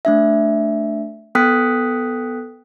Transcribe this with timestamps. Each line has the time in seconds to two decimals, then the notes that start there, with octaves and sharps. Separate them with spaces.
0.05 A3 D4 E5
1.35 B3 A4 G5 D#6 F#6 B6